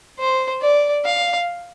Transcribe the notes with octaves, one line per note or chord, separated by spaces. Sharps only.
C5
D5
F5